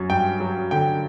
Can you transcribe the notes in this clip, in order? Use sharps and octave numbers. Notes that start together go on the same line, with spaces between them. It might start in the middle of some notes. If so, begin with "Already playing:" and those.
Already playing: F#2 F#3
G2 G5
F#3
D3 G5